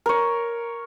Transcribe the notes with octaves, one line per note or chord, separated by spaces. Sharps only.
A#4 C#5